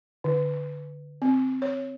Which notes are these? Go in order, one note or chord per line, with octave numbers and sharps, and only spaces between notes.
D3
C4
C#5